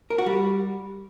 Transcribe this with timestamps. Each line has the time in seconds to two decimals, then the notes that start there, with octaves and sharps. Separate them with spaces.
0.10 A#4
0.18 F#4
0.26 G3